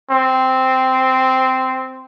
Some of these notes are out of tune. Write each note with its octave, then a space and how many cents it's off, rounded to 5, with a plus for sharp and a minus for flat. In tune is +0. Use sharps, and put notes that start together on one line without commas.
C4 -5